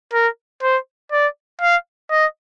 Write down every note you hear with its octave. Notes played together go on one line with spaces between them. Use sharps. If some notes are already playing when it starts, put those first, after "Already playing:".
A#4
C5
D5
F5
D#5